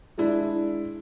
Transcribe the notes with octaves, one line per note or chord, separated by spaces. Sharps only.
G#3 D4 E4